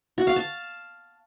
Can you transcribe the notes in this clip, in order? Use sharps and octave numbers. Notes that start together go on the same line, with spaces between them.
F#4
F5
A5